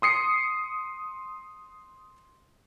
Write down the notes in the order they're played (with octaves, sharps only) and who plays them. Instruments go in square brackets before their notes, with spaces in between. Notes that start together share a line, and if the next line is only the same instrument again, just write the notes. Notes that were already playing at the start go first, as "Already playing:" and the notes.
[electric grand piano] C6 D#6 C7 C#7